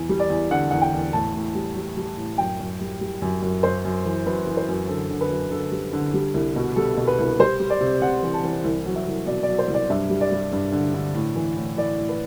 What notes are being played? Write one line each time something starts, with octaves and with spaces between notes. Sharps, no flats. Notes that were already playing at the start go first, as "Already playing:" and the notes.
Already playing: E2
G3
D5
E2
D3 F#5
E2 F#5
G5
E2
A2 A5
A2
G3
G3
G3
A2
F#2 G5
F#2
G3
G3
F#2
F#2
F#2 C5
F#2
E3
F#2 B4
E3
C5
F#2
D3 A4
D3
B4
F#2
D3 A4
G3
D3
G3
C2
B2
G3 A4
B2
B4
C2
G3 C5
G3
D5
C3
C3 F#5
E3
A5
E3
C2
F#3
E5
C2
B2 D5
D5
F#3
C5
C2
D5
G2 E5
G3
D5
G3
G2
D3
D3
A2
E3
A2
E3 D5
A2
B4